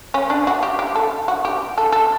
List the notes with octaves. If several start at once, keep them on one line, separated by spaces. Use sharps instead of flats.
C#4
D4
F#4
G4
G4
A4
F#4
G4
A4
A4